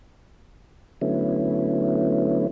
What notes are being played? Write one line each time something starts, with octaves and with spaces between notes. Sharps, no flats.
D3 F#3 A3 B3 C#4 E4